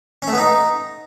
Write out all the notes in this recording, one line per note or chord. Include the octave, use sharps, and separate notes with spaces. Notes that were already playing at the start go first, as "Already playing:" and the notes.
C#4
A3
B3
D#4